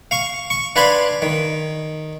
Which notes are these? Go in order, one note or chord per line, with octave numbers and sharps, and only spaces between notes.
F5 C#6
C#6
D4 B4 F5 G#5 B5 C6
D#3